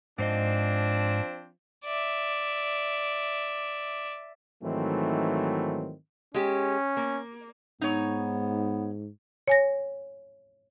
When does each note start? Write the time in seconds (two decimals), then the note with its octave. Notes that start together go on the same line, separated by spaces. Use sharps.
0.19 G#2 F3 C4 D4 C5 D#5
1.85 D5 E5
4.63 G#2 D#3 E3 F#3 A3 C4
6.34 G#3 C#4 G4
6.97 A#3
7.81 G#2 B3 D#4 C#5
9.48 C#5 G#5 A#6